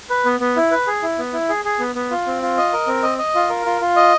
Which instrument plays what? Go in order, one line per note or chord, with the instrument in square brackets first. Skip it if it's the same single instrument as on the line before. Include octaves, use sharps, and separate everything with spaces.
[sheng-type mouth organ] B4
B3
B3
E4
B4
G#4
E4
B3
E4
G#4
G#4
B3
B3
F4
C4
F4
D#5
A#4
C4
D#5
D#5
F4
A#4
F4
F4
D#5